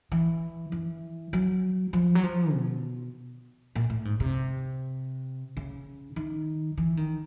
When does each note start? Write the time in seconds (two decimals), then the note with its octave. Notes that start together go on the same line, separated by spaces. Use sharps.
0.12 E3
0.72 E3
1.33 F#3
1.93 F3
2.15 F#3
2.23 F3
2.54 B2
3.75 A#2
3.90 A2
4.05 G#2
4.20 C3
5.57 C#3
6.16 D#3
6.78 E3
6.97 D#3